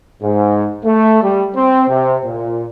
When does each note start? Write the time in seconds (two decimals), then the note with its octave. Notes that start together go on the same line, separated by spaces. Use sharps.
0.22 G#2
0.85 A3
1.22 G3
1.56 C4
1.88 C3
2.25 A#2